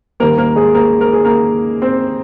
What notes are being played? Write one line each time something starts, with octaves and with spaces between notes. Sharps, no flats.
D#2 D#3 G3 A#3 A#4
A#3 A#4
G#3 G#4
A#3 A#4
A#4
G#4
A#3 A#4
C4 C5